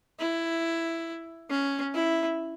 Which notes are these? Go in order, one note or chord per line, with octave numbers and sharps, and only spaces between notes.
E4
C#4
E4